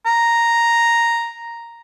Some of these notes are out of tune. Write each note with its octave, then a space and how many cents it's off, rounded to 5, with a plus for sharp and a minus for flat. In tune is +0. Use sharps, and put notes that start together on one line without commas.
A#5 +0